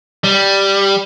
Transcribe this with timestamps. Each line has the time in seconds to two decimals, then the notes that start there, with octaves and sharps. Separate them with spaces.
0.24 G3